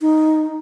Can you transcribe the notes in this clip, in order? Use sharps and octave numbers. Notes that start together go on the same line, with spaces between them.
D#4